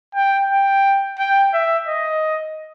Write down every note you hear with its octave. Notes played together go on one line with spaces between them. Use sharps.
G5
G5
G5
E5
D#5